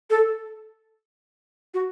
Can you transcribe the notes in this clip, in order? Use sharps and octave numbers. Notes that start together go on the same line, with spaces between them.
A4
F#4